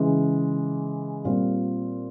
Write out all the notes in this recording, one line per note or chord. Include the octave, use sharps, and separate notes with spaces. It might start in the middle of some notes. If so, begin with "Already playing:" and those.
Already playing: C#3 E3 G#3
A#2 G3 C4 F4